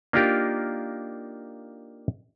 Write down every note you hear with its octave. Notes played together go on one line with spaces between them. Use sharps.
A#3 D4 D#4 F4 G4 A#4